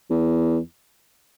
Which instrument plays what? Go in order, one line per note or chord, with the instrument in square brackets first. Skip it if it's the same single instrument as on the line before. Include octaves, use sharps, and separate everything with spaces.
[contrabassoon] E2